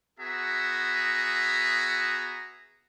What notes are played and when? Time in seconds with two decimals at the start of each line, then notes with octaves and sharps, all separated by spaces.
0.20 B3 F#4 G#4 E5 A#5